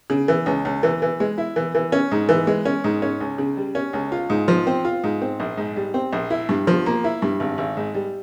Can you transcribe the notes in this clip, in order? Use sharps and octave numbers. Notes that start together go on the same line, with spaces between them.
C#3
E3
C#2
C#2
E3
E3
G#3
E4
E3
E3
C#4
G#2
E3
G#3
C#4
G#2
C#4
C#2
C#3
G3
C#4
C#2
F4
G#2
F3
C4
F4
G#2
C4
A#1
G#2
G3
C4
A#1
E4
G2
F3
A#3
E4
G2
G#1
G#1
G#2
G3